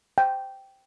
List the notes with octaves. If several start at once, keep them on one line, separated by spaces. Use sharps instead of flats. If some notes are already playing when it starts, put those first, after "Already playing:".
G5